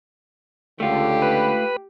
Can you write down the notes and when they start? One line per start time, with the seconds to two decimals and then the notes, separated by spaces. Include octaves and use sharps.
0.80 C#2 D3 A3 F4 G4
1.22 B4